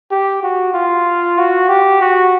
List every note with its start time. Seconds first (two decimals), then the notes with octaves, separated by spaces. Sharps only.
0.11 G4
0.43 F#4
0.74 F4
1.38 F#4
1.69 G4
2.01 F#4